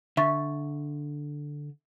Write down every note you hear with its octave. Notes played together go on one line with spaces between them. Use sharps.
D3 E5 C#6 A6